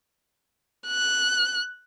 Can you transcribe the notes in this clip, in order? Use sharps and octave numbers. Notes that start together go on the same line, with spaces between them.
F#6